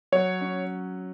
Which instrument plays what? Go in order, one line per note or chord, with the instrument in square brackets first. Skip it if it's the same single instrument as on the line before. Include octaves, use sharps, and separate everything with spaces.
[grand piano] F#3 [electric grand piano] C#5
[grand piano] C#4